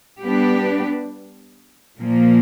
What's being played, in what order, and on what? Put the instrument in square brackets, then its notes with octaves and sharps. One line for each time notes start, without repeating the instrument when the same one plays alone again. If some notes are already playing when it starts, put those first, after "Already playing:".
[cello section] G3 B3 D4 G4 B4
A#2 F3 A#3